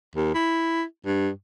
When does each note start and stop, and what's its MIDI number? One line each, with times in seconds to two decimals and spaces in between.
0.15 0.34 39
0.34 0.84 64
1.06 1.29 43